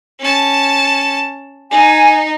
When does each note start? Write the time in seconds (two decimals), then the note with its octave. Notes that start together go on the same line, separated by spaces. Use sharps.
0.20 C#4 A5
1.71 D#4 G#5